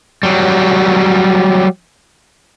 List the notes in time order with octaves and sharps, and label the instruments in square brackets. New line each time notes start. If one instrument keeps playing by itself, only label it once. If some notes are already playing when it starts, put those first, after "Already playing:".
[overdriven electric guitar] F#3 G3